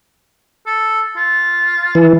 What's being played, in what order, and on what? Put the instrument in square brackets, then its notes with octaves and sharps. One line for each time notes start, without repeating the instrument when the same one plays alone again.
[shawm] A4
F4
[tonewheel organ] E3